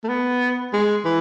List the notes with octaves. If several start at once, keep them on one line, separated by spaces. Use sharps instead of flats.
A3
B3
G#3
E3